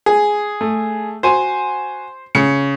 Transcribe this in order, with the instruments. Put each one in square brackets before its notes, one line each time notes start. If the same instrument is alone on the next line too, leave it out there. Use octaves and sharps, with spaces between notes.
[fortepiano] G#4
[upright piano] A3
[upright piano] F#4 G#5 [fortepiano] C5
[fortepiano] C#3 [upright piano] C#7